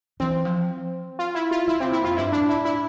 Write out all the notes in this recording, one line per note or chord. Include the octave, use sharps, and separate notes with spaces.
E3 C4
F3
F4
E4
F4
D3 E4
C3 C4
A#2 E4
F2 F4
G2 E4
D4
A2
E4
E4